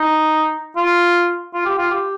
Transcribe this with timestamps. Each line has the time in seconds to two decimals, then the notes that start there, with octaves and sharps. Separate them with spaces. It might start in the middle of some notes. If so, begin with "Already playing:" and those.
Already playing: D#4
0.77 F4
1.53 F4
1.65 G4
1.78 F4
1.91 G4